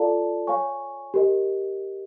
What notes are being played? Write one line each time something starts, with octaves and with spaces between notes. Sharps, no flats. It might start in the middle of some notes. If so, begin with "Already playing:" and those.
Already playing: F4 A4 D5 F5 A5
C#5 F5 G#5 C#6
G4 A#4 D#5